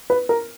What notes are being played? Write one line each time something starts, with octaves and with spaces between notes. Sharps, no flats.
B4
A#4